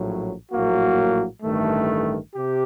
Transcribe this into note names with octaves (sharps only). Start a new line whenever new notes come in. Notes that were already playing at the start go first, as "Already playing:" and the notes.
Already playing: A#1 A2 F#3
A#1 A2 F#3 A#3 F#4
A1 G2 D#3 A3
C3 G4